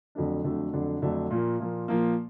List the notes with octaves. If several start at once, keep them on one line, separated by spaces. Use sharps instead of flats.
F2 D3 F#3 A3 D4
F2 D3 F#3 A3 D4
F2 D3 F#3 A3 D4
F2 D3 F#3 A3 D4
A#2 F3 A#3
A#2 F3 A#3
A#2 F3 A#3